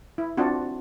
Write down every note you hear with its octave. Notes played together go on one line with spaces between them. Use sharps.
E4
C4 D4 F4 F#4